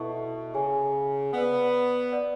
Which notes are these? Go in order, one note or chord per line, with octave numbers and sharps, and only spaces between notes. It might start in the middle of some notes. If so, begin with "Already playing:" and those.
Already playing: B2 E4 A4 E5 A5 C#6
C#3 G#4 C#5 G#5
B3 B4 D5 F#5
B4 D5 F#5